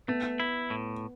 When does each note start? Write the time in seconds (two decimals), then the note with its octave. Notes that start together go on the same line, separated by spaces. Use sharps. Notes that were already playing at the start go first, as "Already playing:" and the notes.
0.08 A3 B3
0.40 E4
0.70 A2